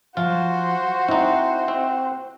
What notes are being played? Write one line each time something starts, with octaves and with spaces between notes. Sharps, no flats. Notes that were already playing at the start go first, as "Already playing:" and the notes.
F3 F4 F#4 C5
C4 D#4 E4
C4